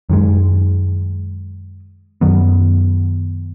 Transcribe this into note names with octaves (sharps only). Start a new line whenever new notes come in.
F#2 D#3 G#3
F#2 D#3 F#3 B3